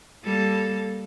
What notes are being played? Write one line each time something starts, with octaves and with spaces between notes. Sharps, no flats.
G3 A#3 A4